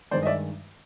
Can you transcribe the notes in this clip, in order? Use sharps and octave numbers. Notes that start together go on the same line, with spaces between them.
G2 D#3 G#3 C5 D5
D#5
D5 E5